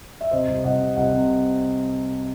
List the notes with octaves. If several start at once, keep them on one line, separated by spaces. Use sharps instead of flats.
E5
C3 C5 D#5
C2
C2 D#5 F#5
C3
C2 D#5 F#5
C3